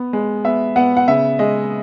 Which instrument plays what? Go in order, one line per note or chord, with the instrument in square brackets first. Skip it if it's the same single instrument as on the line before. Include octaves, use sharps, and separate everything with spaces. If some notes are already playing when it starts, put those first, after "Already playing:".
Already playing: [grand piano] B3
G#3
B3 E5
B3 F#5
F#5
C#3 E5
G#3 D#5